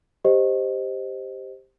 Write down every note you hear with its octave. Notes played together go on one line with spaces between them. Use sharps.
G4 C5 D#5